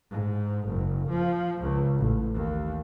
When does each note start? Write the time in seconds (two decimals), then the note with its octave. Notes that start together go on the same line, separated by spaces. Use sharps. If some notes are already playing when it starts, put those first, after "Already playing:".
0.11 G#2
0.68 F#1
1.10 F3
1.61 C#2
1.98 A1
2.35 D#2